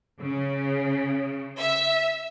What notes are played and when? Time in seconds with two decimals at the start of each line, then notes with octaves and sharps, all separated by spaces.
0.20 C#3
1.59 E5